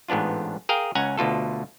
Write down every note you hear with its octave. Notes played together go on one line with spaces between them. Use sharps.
A1 G#2 B3 D4 F4
G#4 A#4 F5 G5
C#2 C#4 F#5 G#5 A#5
D2 B2 F4 A4